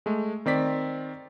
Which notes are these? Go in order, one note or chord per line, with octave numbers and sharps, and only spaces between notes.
G#3 A3
D#3 C4 D5 B6